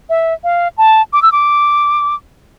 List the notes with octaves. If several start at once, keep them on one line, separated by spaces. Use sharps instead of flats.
E5
F5
A5
D6
E6
D6